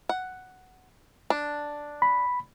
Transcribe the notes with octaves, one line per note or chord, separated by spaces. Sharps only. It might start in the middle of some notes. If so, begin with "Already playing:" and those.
F#5
D4
B5